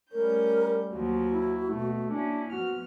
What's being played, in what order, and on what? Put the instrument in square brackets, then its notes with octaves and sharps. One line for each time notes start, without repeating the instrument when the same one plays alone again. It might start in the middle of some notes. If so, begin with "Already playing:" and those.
[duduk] G3 [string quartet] A3 C#4 G6 [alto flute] A#4
[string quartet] D#2 F3 F#3 [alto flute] F#4
[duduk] E4
[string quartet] B2 [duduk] A3
[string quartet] A#3 C#4 E4 [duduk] D4
[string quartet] F3 B3 F6 [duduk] F#4